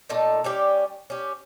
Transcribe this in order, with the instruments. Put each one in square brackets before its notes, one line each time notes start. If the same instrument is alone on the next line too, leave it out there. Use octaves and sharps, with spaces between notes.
[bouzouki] A#2 A3 D#4 A5
G3 C#4 G4
C#4 G4